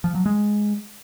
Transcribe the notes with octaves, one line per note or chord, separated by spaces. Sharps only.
F3
F#3
G#3